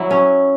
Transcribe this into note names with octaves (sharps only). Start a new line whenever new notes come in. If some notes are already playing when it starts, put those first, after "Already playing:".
Already playing: F#3 E4 F#4
C#4